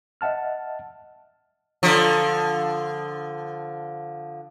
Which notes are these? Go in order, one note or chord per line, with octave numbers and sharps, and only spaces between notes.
D#5 E5 F#5 A5 F6
D3 F3